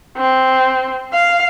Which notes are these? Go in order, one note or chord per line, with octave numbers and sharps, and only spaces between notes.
C4
F5